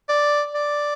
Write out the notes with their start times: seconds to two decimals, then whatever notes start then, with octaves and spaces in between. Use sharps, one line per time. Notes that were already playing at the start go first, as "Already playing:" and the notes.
0.09 D5
0.55 D5